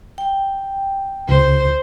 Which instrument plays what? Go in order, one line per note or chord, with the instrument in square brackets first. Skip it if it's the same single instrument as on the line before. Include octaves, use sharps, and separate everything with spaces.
[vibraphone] G5
[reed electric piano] C#2 [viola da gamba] C5